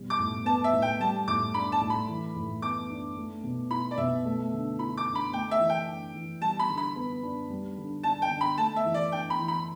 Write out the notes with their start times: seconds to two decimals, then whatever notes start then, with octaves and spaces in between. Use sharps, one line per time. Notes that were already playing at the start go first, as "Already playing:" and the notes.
Already playing: B2 G3
0.10 D6
0.20 A2
0.45 B3 A5
0.64 E5
0.73 A2
0.82 G5
1.00 G3 A5
1.28 A2 D6
1.54 D4 B5
1.72 A5
1.81 A2
1.90 B5
2.08 E3
2.36 A2
2.62 B3 D6
2.90 D4
3.17 A3
3.44 B2
3.70 E4 B5
3.91 D5
3.98 B2 E5
4.25 A3
4.52 D3
4.79 E4 B5
4.97 D6
5.06 D3
5.15 B5
5.33 A3 G5
5.51 E5
5.60 E3
5.70 G5
5.88 D4
6.15 E3
6.41 G3 A5
6.59 B5
6.69 D3
6.78 B5
6.96 B3
7.23 D4
7.50 G3
7.78 D3
8.03 D4 A5
8.22 G5
8.31 D3
8.41 B5
8.58 A3 A5
8.76 E5
8.85 E3
8.94 D5
9.12 D4 G5
9.30 B5
9.40 E3
9.48 B5